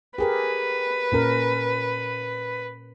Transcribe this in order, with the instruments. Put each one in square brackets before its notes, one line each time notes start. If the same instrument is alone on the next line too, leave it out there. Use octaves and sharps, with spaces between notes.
[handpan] G4 G#4 A#4 [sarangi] B4
[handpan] A#2 C#4 A#4